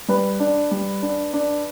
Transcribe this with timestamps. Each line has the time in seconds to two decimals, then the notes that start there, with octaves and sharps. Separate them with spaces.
0.08 G3 B4
0.40 D4
0.71 G3
1.02 D4
1.33 D4